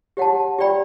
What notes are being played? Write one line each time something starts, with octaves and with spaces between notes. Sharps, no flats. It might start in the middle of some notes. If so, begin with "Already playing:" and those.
G4 C#5 F#5 A5
G4 D5 G5 B5